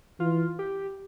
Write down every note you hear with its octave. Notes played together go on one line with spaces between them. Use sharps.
E3 F4
G4